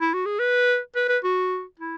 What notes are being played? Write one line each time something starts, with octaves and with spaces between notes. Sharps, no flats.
E4
F#4
G#4
B4
B4
B4
F#4
E4